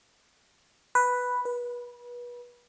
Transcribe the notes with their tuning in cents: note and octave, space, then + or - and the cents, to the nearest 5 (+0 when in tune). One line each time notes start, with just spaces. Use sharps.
B4 +0
B4 -30